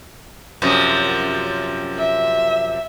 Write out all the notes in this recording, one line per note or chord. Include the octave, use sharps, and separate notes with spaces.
F#2 C3 F3
E5